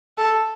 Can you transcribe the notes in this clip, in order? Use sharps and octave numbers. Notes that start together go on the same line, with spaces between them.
A4